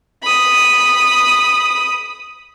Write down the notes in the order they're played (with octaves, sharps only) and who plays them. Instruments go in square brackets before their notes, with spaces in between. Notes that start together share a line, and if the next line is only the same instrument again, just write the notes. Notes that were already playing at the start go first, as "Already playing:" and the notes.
[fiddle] B5 D#6